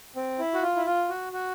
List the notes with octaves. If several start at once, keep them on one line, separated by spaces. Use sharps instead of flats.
C4
E4
F#4
F4
E4
F4
F#4
F#4